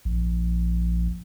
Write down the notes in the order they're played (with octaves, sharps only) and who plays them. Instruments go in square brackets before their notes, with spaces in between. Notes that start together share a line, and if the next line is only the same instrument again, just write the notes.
[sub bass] A#1